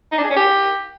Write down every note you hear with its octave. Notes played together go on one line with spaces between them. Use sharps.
D#4
D4
G#4
C#4
G4